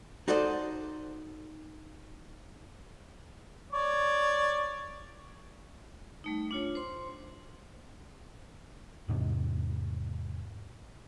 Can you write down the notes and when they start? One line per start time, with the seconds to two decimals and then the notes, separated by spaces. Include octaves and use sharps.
0.28 D#4 F#4 A4 C5 D5 D#5
3.72 C#5 D5
6.24 G3 A3 D#4
6.51 D4 F4 C#5
6.75 C5 C6
9.09 E2 G#2 C3